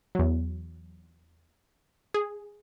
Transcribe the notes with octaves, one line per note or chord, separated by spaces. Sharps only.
E2 F#3
G#4